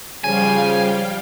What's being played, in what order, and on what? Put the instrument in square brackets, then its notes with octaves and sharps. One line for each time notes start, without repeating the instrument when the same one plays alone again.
[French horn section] C#3 F3 [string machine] G3 F5 G5 [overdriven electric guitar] G#5